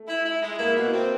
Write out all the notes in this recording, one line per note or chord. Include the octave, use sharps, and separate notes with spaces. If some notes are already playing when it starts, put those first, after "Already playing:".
Already playing: A3
E4
E4
G#3
A#3 E4
B2
C4